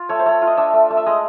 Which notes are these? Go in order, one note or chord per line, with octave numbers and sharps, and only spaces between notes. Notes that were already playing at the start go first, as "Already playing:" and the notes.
Already playing: F4
A3 C#5
C5
A3 C#5
F4
D#5
D4 E5
A3
A3
E5
G#3 D#5